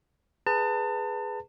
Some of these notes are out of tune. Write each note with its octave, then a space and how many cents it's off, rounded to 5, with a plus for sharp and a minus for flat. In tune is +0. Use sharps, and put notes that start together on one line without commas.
G#4 +0 B4 +0 A5 +35